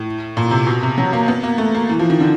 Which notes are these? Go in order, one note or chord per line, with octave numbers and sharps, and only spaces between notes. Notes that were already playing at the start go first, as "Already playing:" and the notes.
Already playing: A2
A#2
C3
B2
C3
F#3
A#3
B3
A#3
A3
A#3
E3
F3
D#3
D3